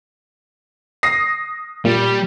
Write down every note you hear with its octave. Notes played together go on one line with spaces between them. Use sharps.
D#6 A#6 C7
A#2 G3